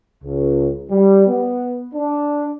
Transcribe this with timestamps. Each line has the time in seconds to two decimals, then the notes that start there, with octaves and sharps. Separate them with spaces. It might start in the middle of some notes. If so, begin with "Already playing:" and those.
0.24 C#2
0.90 G3
1.27 B3
1.94 D4